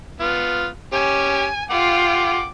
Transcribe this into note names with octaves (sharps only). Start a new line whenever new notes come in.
B3 F4
C#4 G4 G#5
F4 F#5 G5 D6